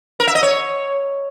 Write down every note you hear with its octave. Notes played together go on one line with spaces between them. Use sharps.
A#4
E5
D#5
C#5